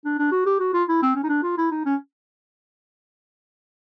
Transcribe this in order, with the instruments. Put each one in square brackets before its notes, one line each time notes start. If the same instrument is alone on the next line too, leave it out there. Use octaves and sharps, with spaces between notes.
[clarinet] D4
D4
F#4
G4
F#4
F4
E4
C4
C#4
D#4
D4
F4
E4
D#4
C#4